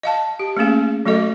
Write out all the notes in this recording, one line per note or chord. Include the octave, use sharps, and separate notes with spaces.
D#5 F5 A5
G4
A3 A#3 C#4 G#4
F#3 A3 F#4 A4 D#5